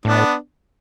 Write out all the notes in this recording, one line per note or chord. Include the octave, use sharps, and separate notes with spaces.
A2 B3 D4